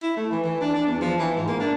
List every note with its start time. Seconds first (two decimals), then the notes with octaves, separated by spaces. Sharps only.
0.03 E4
0.17 A3
0.31 E3
0.44 E3
0.61 D4
0.75 D4
0.86 E2
1.01 F3
1.19 E3
1.36 G#2
1.48 A#3
1.60 D4